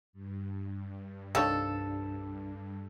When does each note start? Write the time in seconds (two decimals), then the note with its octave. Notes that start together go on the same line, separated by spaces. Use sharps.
0.13 G2
1.35 C2 D#3 F3 D4 A4 C#5